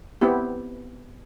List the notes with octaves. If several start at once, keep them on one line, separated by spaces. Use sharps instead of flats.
B3 C4 E4 G4